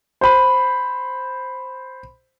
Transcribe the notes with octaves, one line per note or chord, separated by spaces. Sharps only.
C5 B5